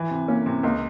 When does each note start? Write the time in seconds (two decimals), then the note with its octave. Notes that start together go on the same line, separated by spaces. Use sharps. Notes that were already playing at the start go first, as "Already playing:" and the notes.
Already playing: E3
0.11 C3
0.28 A#3 C#4
0.46 C3
0.63 C#2 A#3